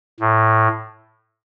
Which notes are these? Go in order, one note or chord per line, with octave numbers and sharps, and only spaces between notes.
A2